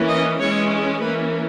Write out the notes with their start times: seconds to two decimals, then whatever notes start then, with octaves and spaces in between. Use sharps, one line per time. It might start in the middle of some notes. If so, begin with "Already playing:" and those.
Already playing: E3 A#3 C#4
0.09 D#5
0.39 E3 G#3 C#4 C#5
1.00 E3 A#3 C#4 B4